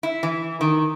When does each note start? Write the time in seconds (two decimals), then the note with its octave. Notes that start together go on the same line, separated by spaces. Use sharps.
0.03 E4
0.23 E3
0.61 D#3